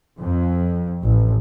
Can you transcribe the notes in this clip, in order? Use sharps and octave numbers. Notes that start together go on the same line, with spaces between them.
F2
A1